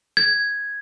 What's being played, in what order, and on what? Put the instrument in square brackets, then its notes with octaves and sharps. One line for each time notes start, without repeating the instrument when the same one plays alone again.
[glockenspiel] G#6